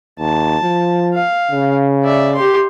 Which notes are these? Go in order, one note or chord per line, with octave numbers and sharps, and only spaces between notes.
D#2 A5
F3
F5
C#3
D5 E5
G4 C6